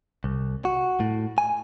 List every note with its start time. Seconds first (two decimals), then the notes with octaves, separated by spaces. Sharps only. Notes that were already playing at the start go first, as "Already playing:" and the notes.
0.24 C2
0.65 F#4
1.00 A2
1.38 G#5